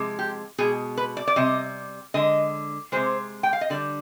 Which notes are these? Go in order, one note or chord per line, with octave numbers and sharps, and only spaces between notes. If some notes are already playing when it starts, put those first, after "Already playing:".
Already playing: C3 F3 G#3
G4
B2 G#3 G#4
B4
D5
D5
C3 G3 D#5
D3 G#3 D#5
C3 F3 G#3 C5
G5
F5
D#5
D3 G3 D5